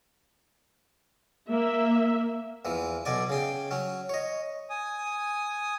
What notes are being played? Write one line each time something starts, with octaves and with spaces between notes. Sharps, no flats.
A#3 E5
E2 E3 F3
B1 B2 D5 G#5
C#3 G#4 G5
F#3 C#4
C#5 D#5
G#5 D#6